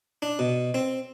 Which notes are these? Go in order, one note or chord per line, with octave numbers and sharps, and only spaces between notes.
D4
B2
C4